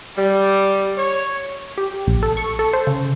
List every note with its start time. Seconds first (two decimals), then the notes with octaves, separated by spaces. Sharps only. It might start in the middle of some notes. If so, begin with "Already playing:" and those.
0.17 G3
0.97 C#5
1.78 G4
2.07 A#1
2.23 A4
2.37 C#6
2.59 A4
2.73 C5
2.87 C#3